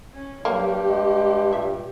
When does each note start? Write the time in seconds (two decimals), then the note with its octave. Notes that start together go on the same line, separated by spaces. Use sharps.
0.13 C#4
0.45 G2 F#3 A#3 G4
0.87 G#3
1.53 A#2 E5